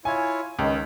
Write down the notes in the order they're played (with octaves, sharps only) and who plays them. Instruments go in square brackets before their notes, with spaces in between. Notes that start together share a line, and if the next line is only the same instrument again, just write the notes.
[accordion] E4 F4 C#5 [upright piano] G#5
[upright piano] C#2 [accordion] D#3